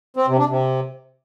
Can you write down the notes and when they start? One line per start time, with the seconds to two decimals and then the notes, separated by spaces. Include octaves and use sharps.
0.17 C4
0.27 C3
0.38 D4
0.49 C3